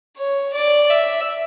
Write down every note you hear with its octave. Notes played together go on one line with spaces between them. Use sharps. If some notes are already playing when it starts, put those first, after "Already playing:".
C#5
D5
E5